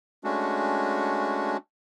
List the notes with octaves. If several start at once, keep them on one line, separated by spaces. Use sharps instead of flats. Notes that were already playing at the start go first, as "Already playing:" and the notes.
G#3 A3 C#4 D4 F#4